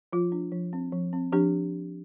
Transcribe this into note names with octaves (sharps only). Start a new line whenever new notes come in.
F3 F4
D4
F3
C4
F3
C4
F3 D4 G4